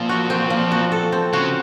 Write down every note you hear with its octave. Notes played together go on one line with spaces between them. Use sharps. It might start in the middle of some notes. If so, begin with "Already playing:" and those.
Already playing: A#2 F3 C4
F#4
C4
F3
F#4
A4
C4
C#3 F#4